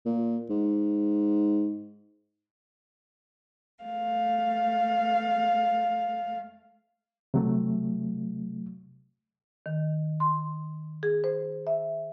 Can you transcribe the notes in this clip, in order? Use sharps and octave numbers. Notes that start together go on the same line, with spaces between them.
A#2
G#2
A3 F5
C3 F#3 A3
D#3
C6
G#4
C5
E5